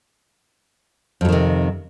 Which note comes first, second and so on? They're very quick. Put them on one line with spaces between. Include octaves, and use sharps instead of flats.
F2 F#3 D#3 C3